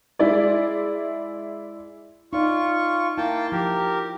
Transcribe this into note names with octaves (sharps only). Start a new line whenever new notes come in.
G#3 E4 G#4 D5
D#4 F4 D5 C#6
A#3 E4 G5 A5
F3 G4 A#4